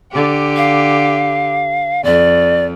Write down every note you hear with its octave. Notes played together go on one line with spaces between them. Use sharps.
D3 G4
F5
F2 D5